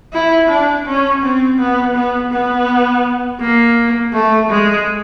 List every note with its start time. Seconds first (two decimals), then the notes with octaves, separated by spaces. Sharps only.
0.13 E4
0.49 D4
0.86 C#4
1.22 C4
1.58 B3
1.95 B3
2.31 B3
3.41 A#3
4.13 A3
4.50 G#3